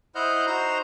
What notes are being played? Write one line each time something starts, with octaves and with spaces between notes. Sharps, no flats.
E4 C5 D#5 F#5 F6 G6
D#4 F#4 C5 A#5 C6 G6